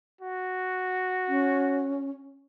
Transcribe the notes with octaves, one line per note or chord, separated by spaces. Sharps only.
F#4
C#4